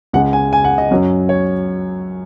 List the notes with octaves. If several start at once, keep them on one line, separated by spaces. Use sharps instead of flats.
C#2 C#3 G#3 C#4 F#5
G#5
G#5
F#5
D#5
F#2 F#3 C#4
C#5